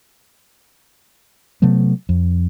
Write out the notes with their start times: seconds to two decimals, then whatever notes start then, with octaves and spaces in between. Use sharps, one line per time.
1.62 C3 F#3 A3 B3
2.09 F2